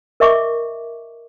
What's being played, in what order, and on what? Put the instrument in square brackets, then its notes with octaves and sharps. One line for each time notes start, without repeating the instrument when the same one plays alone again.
[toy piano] A#4 D#5 E5 C#6 D6